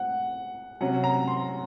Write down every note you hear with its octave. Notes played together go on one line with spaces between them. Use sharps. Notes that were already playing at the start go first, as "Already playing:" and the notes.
Already playing: F#5
C3 F#3 C#4 F#5
A#5
C6